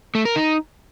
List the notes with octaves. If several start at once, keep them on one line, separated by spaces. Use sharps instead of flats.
A3
A#4
D#4